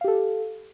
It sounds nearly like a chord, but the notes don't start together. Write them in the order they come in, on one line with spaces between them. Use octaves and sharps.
F5 G4 A4